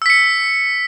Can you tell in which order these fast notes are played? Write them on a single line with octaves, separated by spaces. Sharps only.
E6 B6 C#7